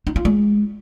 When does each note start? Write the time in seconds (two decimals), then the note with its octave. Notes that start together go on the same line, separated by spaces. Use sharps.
0.07 D#4
0.16 F4
0.25 G#3